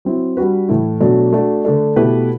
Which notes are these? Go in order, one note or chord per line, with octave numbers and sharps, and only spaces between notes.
F#3 C4 E4
G3 D4 F#4 B4
A2 E3 A3 E4
B2 F#3 A3 D4
A3 D4 F#4
D3 A3 D4
B2 A3 E4 G4 B4